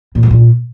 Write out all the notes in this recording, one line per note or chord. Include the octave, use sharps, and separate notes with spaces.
A#2
F#2
A#2